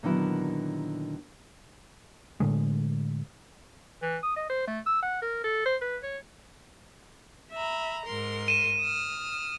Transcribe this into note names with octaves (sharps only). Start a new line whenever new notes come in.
A#2 D3 D#3 F#3 B3 E4
A2 D3 G#3
E3
D#6
D#5
C5
A3
E6
F#5
A#4
A4
C5
B4
C#5
E5 A#5 B5
G#2 A#4 C6
D#7 E7
D#6 F6